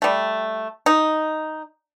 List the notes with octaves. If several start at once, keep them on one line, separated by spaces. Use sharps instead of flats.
G3 A3
D#4